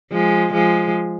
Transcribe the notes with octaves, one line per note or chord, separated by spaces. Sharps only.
F3 G#3
F3 G#3